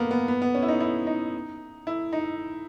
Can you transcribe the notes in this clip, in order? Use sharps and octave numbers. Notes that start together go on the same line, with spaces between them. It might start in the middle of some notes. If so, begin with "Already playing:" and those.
Already playing: A#3 B3
B3
B3
B3
C#4
E4
D#4
E4
D#4
E4
D#4